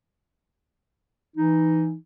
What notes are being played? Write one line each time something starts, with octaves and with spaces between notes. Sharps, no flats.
E3 D#4